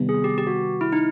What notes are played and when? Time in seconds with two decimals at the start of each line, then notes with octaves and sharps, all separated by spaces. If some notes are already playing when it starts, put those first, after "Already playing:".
Already playing: C3 D#3 G3 B3
0.09 G#4
0.24 G4
0.38 G4
0.47 F#4
0.81 E4
0.92 D#4